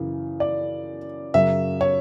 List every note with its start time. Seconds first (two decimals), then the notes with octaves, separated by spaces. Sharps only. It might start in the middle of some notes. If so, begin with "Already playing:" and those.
Already playing: F#2 C#3 E3
0.40 D5
1.34 F#2 C#3 F#3 E5
1.81 C#5